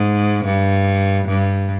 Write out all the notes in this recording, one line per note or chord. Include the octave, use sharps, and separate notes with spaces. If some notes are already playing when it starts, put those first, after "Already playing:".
Already playing: G#2
G2
G2